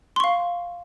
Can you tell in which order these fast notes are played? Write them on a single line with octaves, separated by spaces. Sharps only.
C6 C#6 F5